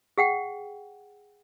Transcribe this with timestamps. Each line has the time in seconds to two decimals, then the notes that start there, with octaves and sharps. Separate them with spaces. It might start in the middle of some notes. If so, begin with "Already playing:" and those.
0.18 G#4 F#5 G5